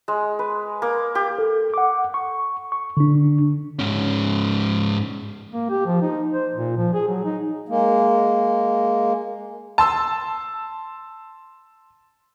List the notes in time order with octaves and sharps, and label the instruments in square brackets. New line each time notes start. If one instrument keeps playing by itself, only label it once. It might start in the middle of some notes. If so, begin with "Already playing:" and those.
[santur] G#3
B4
A#3
G4
[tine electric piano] A4
F#5 D6
C#6
C#6
D3 D4
[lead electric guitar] G#2 C#4
[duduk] A#3
G4
F3
D#4
C5
A#2
F3
G#4
F#3
D#4
[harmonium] G#3 A#3
[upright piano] A5 C6 E6